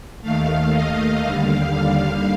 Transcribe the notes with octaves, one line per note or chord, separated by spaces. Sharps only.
D#2 D#3 A3 F5
D#5
D#2 D3 G3 F5
F5